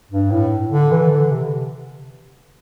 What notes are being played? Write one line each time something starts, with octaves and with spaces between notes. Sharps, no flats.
G2
A2
D3
E3
D3
C3